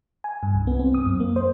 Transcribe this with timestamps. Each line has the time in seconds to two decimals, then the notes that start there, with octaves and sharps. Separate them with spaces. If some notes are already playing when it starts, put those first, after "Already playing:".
0.24 G#5
0.43 G2
0.55 C2
0.67 B3
0.79 C4
0.94 D#6
1.06 F#2
1.20 A#3
1.36 C5